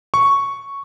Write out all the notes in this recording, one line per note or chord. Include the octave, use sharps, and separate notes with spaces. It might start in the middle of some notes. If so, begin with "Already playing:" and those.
C#6